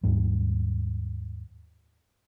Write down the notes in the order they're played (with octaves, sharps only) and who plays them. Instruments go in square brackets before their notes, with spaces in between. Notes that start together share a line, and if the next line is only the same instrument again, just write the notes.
[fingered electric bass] D#2 G#2 G3